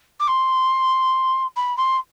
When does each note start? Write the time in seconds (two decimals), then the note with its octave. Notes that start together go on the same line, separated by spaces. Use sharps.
0.20 D6
0.27 C6
1.56 B5
1.77 C6